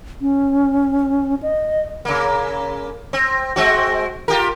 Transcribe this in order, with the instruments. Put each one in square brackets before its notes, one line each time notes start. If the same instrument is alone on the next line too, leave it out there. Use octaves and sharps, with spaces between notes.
[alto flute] C#4
D#5
[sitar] C#3 A#3
C4
G#3 C4 F#4
F4 G4 A#4